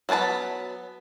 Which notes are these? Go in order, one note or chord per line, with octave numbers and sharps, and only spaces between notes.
F#3 B3 B4 A5 B5